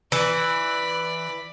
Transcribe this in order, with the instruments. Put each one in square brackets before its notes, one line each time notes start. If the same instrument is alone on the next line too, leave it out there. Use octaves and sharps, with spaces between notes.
[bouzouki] E3 [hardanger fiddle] D5 B5